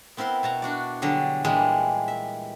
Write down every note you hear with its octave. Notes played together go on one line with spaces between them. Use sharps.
B3 C4 E4 A#4 C6
B2 A5 A#5
D4 F#4 D5
D3 F#3 G3 G#4
A#2 E3 G3 G#3 G#4
E5